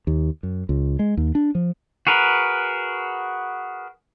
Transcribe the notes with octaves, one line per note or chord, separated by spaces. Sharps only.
D#2
F#2
C#2
G#3
D#2
D4
F3
F#4 G#4 A#4 B4